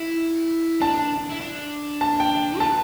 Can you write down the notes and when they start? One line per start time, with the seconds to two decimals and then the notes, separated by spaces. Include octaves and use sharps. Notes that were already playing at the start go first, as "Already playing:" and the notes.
Already playing: E4
0.81 D4 A5
1.30 E4
1.41 D4
2.01 A5
2.20 G5
2.60 B4 A5